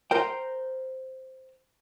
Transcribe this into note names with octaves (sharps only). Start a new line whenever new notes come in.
A#4 C5 G5